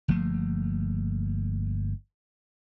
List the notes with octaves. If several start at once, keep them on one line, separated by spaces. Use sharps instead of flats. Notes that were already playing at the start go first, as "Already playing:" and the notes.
G1 F3 A3 A#3